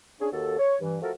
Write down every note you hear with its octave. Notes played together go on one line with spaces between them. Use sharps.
C#4 D4 G#4
D#2 F#4 A4
C#5
G2 E3
F3 A3 F#4 A4 A#4